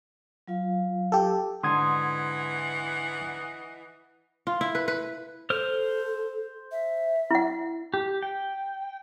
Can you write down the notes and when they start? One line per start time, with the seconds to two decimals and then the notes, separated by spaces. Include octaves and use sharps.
0.47 F#3 F4 F5
1.12 G4 A4
1.63 G#2 D3 E3 D#5 F#5 C6 D#6 G#6
4.47 F4
4.61 E4
4.75 B4
4.88 B4
5.50 A4 C5 F6
6.72 E5
7.31 E4 F#5
7.94 G4
8.23 G5